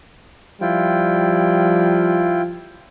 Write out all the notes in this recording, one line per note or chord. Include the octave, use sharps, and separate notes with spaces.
F3 G3 E4 F4 G5